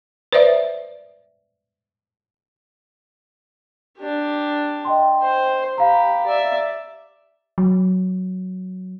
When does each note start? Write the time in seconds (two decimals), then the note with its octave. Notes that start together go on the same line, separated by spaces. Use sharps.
0.33 B4 C5 D5 E5
3.98 D4 G4
4.85 D#5 G5 C6
5.21 C5
5.78 G4 F5 A#5 B5
6.26 D5 E5
7.58 F#3